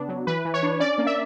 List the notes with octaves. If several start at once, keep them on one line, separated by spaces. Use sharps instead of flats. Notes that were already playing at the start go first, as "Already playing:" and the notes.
Already playing: C#3 B3 D4
F#3
E3 B4
E3
C#5
D4
C#4 D5
A#3
E5